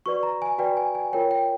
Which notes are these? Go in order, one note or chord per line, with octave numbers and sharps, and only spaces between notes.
F#4 B4 D5 C#6
A#5
G#5
F#4 B4 D5 G5
G#5
G#5
F4 A#4 C#5 G5
G5